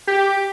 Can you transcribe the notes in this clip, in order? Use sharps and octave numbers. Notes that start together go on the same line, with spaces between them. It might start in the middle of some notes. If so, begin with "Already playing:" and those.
G4